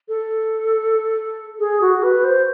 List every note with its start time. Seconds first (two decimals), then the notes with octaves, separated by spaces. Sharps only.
0.09 A4
1.59 G#4
1.81 F#4
2.03 B4
2.24 C5